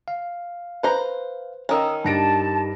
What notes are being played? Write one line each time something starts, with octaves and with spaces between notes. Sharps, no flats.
F5
B4 C5 A#5
D#3 C#4 A#5 D#6 E6
G2 D#4 G4 A5 A#6 D7